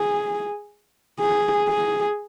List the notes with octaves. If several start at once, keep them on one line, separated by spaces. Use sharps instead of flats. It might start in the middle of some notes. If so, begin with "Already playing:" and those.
Already playing: G#4
G#4
G#4